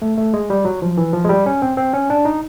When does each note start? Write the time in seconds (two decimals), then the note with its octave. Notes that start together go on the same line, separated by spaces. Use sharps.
0.02 A3
0.17 A3
0.34 G#3
0.50 G3
0.65 F#3
0.82 F3
0.97 E3
1.13 F3
1.25 G#3
1.29 G3
1.46 C#4
1.62 C4
1.77 C4
1.94 C#4
2.10 D4
2.25 D#4